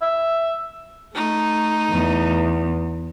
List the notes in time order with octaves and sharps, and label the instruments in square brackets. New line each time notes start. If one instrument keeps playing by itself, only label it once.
[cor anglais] E5
[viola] A3 D#4
[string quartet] E2